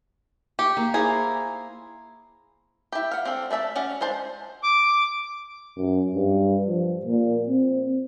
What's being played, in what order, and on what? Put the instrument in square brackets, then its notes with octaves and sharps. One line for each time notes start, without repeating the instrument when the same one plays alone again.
[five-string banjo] G4 [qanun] C#6
[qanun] A#3
[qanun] E4 A#4 C5 [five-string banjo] G#4
[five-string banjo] E4 G4
F5 F#5
C4 D4 A4
A3 D5 E5 A5
C#4 F#4 D5 F#5
G#3 D4 C5 A5
[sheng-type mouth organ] D6
[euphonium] F#2
G2
F3
A#2
C4